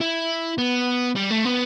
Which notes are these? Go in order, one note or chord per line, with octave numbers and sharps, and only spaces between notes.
E4
B3
G3
A3
B3